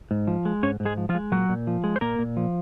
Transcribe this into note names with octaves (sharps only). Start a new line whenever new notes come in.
G#2
F3
G#3
G#2 C#4 C#5
G#2
G#3 G#4
F3
F3 F4
G#3
A#2 F#3 F#4
A#2
F3
G#3
C5
A#2 A#3 A#4
A#2
F3